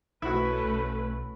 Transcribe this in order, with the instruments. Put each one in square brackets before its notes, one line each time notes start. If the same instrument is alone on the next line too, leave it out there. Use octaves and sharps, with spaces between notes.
[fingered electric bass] B1 [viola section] A3 C#4 B4 [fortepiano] E4 F#4
[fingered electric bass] B1